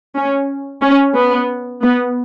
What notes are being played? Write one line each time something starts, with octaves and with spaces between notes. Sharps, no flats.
C#4
C#4
B3
B3